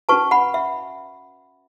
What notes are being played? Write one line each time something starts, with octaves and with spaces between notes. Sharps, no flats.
C#4 F#4 B4 A5 C#6
F#5 B5
E5